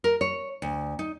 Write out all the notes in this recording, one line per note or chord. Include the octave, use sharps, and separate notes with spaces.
A#4
C#5
D2
D#4